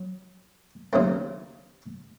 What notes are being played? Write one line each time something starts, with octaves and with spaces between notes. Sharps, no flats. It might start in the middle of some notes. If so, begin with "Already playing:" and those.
Already playing: F#3
D#2 C#3 F#3 A3 C4